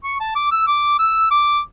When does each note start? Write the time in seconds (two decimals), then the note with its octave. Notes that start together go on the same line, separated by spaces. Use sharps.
0.04 C#6
0.20 A5
0.36 D6
0.52 E6
0.67 D6
0.99 E6
1.31 D6